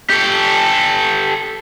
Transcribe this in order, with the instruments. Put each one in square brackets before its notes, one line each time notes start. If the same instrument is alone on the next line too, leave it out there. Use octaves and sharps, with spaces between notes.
[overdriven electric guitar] G4 A4